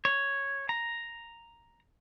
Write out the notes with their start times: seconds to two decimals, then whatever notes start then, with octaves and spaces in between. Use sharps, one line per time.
0.05 C#5
0.69 A#5